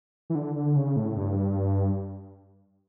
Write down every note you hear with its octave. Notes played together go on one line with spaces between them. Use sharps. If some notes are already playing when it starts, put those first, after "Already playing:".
E3
D3
D3
C#3
A2
G2